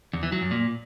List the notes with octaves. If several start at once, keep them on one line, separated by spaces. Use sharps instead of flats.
E2
E3
F#3
F#2
A#2